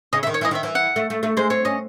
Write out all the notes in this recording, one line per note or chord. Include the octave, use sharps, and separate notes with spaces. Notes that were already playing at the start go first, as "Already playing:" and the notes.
C#3 D#5
C#3 E5
D#3
C#5
E3 D#5
D#3 E5
E3
F#5
A3
A3
A3
G#3 C5
C4 C#5
C#4 D#5